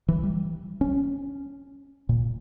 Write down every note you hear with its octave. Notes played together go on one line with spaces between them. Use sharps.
E3
G3
C#4
A#2